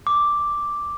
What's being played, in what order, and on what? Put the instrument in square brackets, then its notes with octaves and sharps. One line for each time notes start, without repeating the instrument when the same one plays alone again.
[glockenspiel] D6